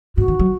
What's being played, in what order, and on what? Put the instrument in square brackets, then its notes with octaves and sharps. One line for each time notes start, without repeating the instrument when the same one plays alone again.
[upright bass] G#2 [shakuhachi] F#4
[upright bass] D#3
F#3